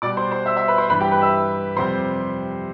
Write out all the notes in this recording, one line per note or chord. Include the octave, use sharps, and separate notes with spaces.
B2 G3 D5 D6
C5 C6
C5 C6
E5 E6
E5 E6
B4 B5
C5 C6
G2 E3 G3 B4 B5
G4 G5
B4 B5
E5 E6
F2 C3 G3 C5 C6